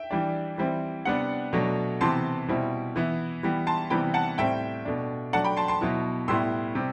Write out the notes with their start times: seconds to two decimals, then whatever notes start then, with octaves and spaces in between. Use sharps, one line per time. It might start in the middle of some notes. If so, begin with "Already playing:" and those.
Already playing: E5 G5
0.11 E3 G3 D4
0.58 E3 G3 C4 E4
1.05 C3 G3 B3 D4 F#5
1.53 B2 F#3 A3 D4
2.01 C3 E3 B3 A5 C6
2.48 B2 G3 C4 E4
2.96 E3 B3 E4
3.43 E3 G3 B3
3.67 A5 C6
3.90 C3 E3 G3 B3 G5 B5
4.14 F#5 A5
4.38 A2 G3 C4 E5 G5
4.85 B2 A3 D4
5.33 F#3 A3 D4 F#5 A5
5.44 G5 B5
5.57 A5 C6
5.68 A5 C6
5.81 B2 F#3 B3 E4
6.28 A2 G3 B3 E4 C6 E6
6.75 C3 G3